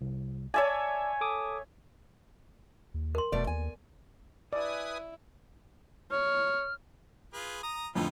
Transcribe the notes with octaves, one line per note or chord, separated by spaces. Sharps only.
C2
C#5 D5 E5 G#5 A5
A4 D6 D#6
D#2
A#4 C6
E1 B2 A3 D5
D#2 G#5
E4 B4 D5 G#5 D#6
C#5 F6
F4 G#4 B4
A#5 D#6
F2 A2 D3 B3 D#4 F4